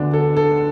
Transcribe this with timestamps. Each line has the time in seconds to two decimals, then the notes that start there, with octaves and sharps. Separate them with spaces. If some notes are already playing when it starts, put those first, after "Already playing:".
Already playing: D2 D3 B3 D4
0.13 A4
0.37 A4